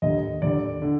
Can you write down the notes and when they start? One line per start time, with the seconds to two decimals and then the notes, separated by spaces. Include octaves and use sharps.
0.02 D#2 D3 D#5
0.42 D#2 D3 D5
0.82 D3